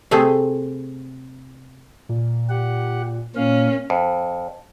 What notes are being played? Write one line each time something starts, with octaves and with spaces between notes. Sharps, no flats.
C3 A3 C4 G#4
A#2
G4 F#5
A#2 A#3 C#4 F5
F2